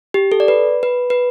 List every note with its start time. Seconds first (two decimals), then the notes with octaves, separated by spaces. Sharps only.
0.14 G4
0.32 A4
0.40 D5
0.48 B4
0.83 B4
1.10 B4